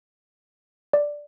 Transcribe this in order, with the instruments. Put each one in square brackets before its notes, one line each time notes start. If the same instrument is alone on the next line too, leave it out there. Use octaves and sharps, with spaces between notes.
[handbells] D5